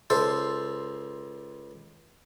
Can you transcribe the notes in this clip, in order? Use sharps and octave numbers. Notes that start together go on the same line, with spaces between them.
C#2 A4 C5